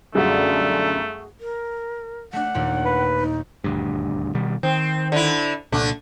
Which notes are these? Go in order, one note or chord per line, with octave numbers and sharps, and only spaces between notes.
B1 F#2 D3 G3 A3 F#4 G#4
A#4
A3 D4 F#5
D#2 A#2
B4
D#4
D#1 D2 G2
B2 D#3 G3
D#3 C4
D3 E4
C2 A#2 D3 A3 D4